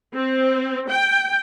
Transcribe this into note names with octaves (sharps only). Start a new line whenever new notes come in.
C4
G5